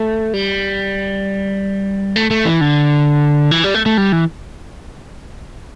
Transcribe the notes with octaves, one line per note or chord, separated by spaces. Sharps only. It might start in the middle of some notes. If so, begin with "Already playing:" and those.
Already playing: A3
G3
A3
A3
E3
D3
E3
G3
A3
A3
G3
E3